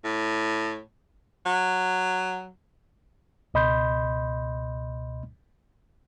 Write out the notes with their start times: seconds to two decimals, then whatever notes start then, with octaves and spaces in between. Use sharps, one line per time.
0.04 A2
1.46 F#3
3.54 C#2 B2 D#5 B5 C6 G6